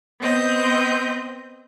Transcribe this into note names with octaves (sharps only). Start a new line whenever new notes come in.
B3 C4 D#5 G6